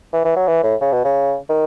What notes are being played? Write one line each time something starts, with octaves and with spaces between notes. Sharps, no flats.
E3
E3
F#3
E3
A2
C#3
B2
C#3
D#3